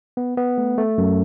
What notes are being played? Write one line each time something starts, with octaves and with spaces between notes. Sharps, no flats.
B3
B3
A3
A3
F#2